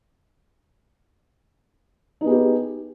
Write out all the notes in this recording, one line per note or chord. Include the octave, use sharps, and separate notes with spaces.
B3 D#4 G4 G#4